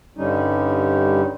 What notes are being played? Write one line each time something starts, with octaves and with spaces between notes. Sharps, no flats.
G2 D3 G3 C#4 D#4